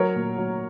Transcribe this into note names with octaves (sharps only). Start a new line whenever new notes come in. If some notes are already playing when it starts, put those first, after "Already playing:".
Already playing: F#3 A#4 C#5
A#2
F#3